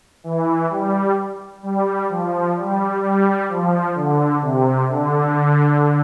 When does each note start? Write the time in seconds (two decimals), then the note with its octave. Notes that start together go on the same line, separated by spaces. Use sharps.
0.24 E3
0.69 G3
1.63 G3
2.10 F3
2.57 G3
3.02 G3
3.49 F3
3.95 D3
4.41 C3
4.88 D3